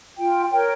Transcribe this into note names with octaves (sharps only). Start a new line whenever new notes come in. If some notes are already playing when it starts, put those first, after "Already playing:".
F4 G5
A#4 C#5 G5